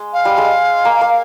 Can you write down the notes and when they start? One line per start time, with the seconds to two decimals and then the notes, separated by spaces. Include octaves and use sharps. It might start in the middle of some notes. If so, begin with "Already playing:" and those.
Already playing: G#3
0.13 F5
0.25 G3
0.38 G#3
0.85 A#3
1.01 A#3